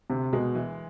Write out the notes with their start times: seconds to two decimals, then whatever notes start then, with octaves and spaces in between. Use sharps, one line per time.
0.10 D2 C3
0.33 B2 G#3
0.55 E3